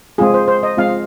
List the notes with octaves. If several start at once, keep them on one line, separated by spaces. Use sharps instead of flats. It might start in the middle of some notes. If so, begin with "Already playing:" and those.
G#3 C4 F4 G#4
C5
C5
D#5
G#3 C4 F4 F5